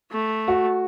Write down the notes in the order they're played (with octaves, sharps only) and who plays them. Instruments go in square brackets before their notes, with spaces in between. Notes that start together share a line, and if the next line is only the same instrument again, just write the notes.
[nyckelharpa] A3
[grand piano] F#4